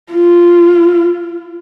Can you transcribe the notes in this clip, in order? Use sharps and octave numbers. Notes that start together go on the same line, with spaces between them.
F4